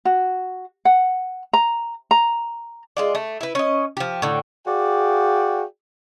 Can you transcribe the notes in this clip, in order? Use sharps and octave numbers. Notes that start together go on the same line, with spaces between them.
F#4
F#5
A#5
A#5
G#3 F4 D5
A3
E4 B4
C#4 D#5
F3 G4
A2 D3
F#4 G#4 D5 F5 G5